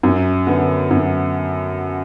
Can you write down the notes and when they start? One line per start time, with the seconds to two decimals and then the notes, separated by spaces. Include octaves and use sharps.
0.03 F#2
0.47 D3 B3
0.91 F#2